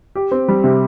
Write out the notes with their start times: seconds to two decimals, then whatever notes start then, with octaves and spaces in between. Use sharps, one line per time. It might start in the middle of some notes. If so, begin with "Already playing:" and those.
0.15 G4
0.31 C4
0.48 G3
0.64 C3